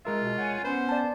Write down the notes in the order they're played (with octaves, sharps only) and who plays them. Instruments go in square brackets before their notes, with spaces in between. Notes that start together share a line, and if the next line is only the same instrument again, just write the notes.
[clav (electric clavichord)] G#3 A#4 E5 [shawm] F4
[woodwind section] B2
C#5 F#5 G#5
[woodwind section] B3 C#4 [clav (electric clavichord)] B4 G#5 [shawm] C5
[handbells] D5 A5